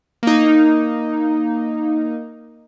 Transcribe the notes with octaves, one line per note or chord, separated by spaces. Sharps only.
A#3 D#4